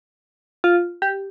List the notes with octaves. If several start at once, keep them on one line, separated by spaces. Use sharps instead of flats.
F4
G4